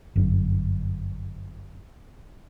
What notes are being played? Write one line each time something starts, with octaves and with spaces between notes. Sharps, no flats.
G1 F#2